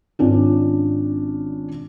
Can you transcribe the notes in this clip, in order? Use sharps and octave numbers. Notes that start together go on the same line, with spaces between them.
G#1 C#4 D4 F4